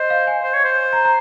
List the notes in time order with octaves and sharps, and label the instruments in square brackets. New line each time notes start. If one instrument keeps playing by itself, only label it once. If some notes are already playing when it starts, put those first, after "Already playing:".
Already playing: [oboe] C5 [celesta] D#5
[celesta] F5
G#5
[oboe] C5
C#5
C5
[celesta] A#5
A#5